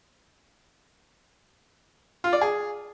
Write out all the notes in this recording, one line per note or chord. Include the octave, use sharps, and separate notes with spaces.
F4
D5
G#4